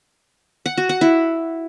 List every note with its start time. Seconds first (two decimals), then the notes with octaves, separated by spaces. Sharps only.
0.66 F#5
0.77 F#4
0.89 F#5
1.01 E4